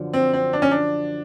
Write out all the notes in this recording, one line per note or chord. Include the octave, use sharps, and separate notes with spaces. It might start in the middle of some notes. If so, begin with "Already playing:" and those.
Already playing: F#2 D3 F3
C4
C4
D4
C#4
D4